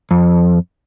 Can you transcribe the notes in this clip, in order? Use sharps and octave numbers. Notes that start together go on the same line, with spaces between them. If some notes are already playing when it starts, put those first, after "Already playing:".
F2